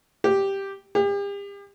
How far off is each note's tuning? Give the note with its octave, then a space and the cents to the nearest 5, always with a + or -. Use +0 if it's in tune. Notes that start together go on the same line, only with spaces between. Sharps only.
G4 +0
G4 +40